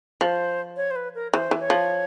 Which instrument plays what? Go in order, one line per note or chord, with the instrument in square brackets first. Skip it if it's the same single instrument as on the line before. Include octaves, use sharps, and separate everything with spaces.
[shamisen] F3 [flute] C5
[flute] C#5
C5
B4
A#4
[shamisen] E3 [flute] C5
[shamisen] E3
[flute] C#5
[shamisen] F3